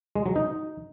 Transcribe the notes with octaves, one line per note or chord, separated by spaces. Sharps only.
G#3
F#3
D#4